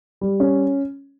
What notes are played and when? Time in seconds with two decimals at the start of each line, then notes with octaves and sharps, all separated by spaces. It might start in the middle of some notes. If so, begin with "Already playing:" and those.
0.21 G3
0.40 C#4